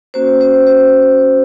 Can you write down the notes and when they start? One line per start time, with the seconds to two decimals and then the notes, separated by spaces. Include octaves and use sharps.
0.14 A#3 C#4 F#4 C5
0.41 C5
0.67 C5